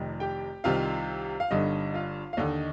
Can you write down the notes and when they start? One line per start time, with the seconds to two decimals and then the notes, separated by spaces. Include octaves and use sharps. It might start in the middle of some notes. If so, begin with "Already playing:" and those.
Already playing: F1 F2 C3 D#3
0.20 G4 G5
0.64 C2 C3 D#3 F4 F5
1.40 F5
1.51 G1 G2 D3 D#4 D#5
1.94 F4 F5
2.33 F5
2.37 D#2 D3 D#4 D#5